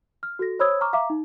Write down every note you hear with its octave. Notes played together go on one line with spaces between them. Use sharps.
F6
F#4 A4 A#6
C5 C#5 B5 D#6 E6 G#6
A#5 C#6 D6 F6
E5 F5 A#5 D6
D#4